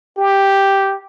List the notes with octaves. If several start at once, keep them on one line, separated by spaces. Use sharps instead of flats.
G4